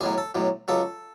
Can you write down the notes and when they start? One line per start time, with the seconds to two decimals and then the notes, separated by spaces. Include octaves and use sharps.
0.01 B1 A2 F#3 G#4
0.18 A4
0.35 B1 A2 F#3
0.68 C#2 C#3 F#3 A4